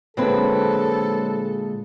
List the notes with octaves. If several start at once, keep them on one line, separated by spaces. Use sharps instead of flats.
A#2 D3 F#3 G#3 C4 A4 B4